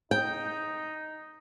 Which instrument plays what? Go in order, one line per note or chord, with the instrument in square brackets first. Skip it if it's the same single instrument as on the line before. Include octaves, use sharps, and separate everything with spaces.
[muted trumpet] D#4 [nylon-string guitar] G5